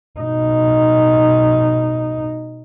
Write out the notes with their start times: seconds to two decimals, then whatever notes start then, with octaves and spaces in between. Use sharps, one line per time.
0.20 B2 D#4